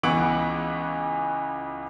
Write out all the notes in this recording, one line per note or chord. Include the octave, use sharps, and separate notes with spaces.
C#2 E3 B3 C#6 D7 F#7